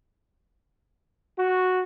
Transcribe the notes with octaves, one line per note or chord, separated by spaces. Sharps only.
F#4